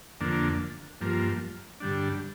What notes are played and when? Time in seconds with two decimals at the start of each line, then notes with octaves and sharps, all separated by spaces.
0.21 F2 D3 A#3 D4
1.01 G2 F3 A#3
1.80 G2 D3 G3 D4